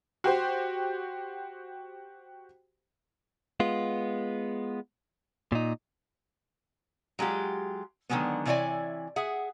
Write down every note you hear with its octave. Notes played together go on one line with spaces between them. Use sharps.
F#4 G4 C5
G#3 B3 F4
A#2 D#4
F#3 G#3 F4 G4
D3 D#3 F3 F#3 G#3 B3
C3 E3 E4 C#5 D5 G#5
G#4 E5 F#5